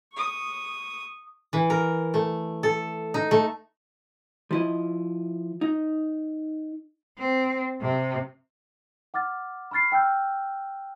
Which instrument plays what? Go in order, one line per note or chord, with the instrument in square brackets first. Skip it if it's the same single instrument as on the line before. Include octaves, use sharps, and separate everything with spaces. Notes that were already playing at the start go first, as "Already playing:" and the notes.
[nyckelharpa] C#6 D#6
[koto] E3
A#4
A3
A4
D#4
A3
[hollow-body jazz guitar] F3 E4 D#5
D#4
[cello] C4
C3
[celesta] F#5 D6 F6 A6
B5 C#6 F6 A6 C7
G5 E6 F6 G6